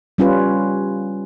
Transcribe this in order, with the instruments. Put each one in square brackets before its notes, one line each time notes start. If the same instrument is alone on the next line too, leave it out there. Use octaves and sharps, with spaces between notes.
[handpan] G3 C#4 F4 B4